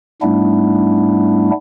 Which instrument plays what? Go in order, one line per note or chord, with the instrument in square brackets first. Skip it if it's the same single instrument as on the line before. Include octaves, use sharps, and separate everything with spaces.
[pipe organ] G#2 G3 A3 B3 D4 E4